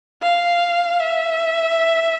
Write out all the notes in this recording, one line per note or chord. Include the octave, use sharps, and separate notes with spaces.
F5
E5